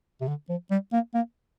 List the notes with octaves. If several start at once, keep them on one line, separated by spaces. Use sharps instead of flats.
C3
D3
F3
G3
A#3
A#3